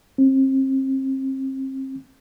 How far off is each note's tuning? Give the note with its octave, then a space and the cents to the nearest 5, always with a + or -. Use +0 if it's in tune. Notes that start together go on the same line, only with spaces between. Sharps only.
C4 +35